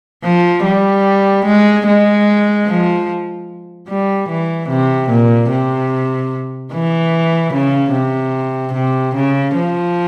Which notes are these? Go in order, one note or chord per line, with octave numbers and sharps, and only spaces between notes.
F3
G3
G#3
G#3
F3
G3
E3
C3
A#2
C3
E3
C#3
C3
C3
C#3
F3